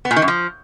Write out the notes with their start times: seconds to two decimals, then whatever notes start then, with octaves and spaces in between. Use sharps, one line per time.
0.05 B3
0.11 A#2
0.16 D#3
0.22 F#2
0.28 F3